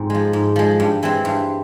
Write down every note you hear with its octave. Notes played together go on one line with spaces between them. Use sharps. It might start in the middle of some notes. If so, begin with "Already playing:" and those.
Already playing: G#2 C4 F4
F3 G#3
G#2
F3 G#3
G2
E3 G#3 C4
G2